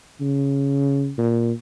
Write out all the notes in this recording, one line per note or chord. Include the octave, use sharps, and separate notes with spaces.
C#3
A#2